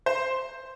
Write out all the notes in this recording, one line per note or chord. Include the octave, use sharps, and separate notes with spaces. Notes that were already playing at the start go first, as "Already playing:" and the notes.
C5